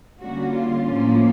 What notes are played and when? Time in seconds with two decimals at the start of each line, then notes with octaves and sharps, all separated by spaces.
0.21 D3 G3 A#3 C#4 F#4
0.53 F4
0.86 A2 F3 A#3 C#4